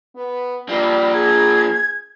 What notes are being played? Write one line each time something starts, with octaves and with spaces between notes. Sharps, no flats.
B3
F3 G3 A#3
G#4 G#6